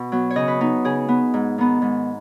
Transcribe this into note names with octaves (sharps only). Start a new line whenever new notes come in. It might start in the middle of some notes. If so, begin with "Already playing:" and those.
Already playing: B2
F#3 B3
C#5
C#3 D#5
B4
B3 D#4
C#3 G#4
B3
G#2
D#3 B3
G#2